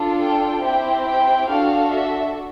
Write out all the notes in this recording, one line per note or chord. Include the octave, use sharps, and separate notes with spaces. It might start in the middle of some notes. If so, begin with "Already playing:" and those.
Already playing: D4 F4 A4
G5
C4 E4 G4 G5
G5
D4 F#4 A4 F5
E5